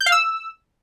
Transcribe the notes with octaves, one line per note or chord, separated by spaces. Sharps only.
G6
F5
E6